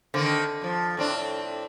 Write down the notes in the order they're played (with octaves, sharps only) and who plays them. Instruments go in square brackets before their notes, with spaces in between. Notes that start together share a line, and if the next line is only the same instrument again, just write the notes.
[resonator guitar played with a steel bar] D3 [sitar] D#3 A#3 C4
[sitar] F2 F3
A2 C4 D4